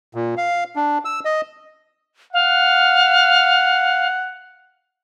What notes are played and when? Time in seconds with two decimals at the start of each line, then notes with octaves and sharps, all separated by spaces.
0.15 A#2
0.37 F5
0.76 D4
1.05 E6
1.25 D#5
2.33 F5 F#5